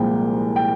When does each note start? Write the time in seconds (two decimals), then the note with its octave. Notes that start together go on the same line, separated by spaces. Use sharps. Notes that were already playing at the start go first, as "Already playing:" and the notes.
Already playing: C2 A#2 F3 G#3 G5
0.56 G5